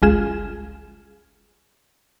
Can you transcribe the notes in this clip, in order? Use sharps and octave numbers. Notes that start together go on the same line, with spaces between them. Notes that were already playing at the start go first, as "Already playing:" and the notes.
G1 C#2 G#3 F4 G#4 E7